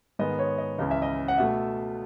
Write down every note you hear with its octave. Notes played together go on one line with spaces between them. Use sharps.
G#2 D#3 G#3 B3 D#5
C#5
D#5
C#2 C#3 E3 D#5
E5
D#5
F#5
B2 A3 E5